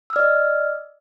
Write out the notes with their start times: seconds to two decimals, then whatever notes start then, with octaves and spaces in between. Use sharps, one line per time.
0.10 E6
0.13 F6
0.16 D5
0.19 D#5